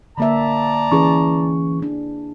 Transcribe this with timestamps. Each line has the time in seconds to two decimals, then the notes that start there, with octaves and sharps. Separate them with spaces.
0.18 D3 A#3 D5 E5 A5 A#5
0.92 E3 C#4 E4 G#4 B4 C#6
1.82 D4